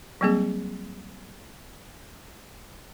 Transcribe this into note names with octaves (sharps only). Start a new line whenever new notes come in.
F#3 G3 A#3 C4 G#4